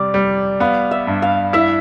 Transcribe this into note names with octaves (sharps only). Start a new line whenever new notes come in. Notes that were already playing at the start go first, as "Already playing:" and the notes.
Already playing: C3 G3 D5
G3
B3 F5
E5
G2
F5
E4 E5